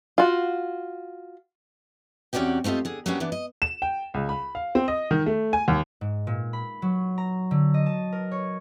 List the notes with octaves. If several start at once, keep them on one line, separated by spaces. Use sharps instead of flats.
F4 F#4
E2 C3 C#4 F#4 D5 G5
A3 C4 F4 G4 D#5
D3 G#4
F#3 G3 A#3 B3 C#4 D4
E3 B3 D4
D#5
E7
G5
C#2
B5
F5
C4
D#5
D#3
A3
G#5
D#2
G#2
A#2
B5
F#3
A#5
D3
D#5
A5
A#4
C#5